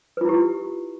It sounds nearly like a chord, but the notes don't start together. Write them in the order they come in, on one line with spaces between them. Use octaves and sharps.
B4 F4 E4 G4